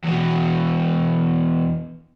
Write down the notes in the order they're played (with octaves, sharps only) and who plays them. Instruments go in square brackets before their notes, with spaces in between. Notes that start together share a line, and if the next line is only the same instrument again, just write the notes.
[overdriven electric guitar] E2 B2